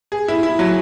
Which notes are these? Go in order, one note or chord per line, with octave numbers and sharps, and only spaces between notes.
G#4
E4
E4
F#3